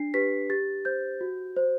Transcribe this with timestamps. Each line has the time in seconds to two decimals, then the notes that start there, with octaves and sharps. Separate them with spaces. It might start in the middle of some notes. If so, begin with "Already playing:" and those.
Already playing: D4 C7
0.14 G4 B4 B6
0.50 G4 A6
0.85 C5 G6
1.21 F#4
1.56 C5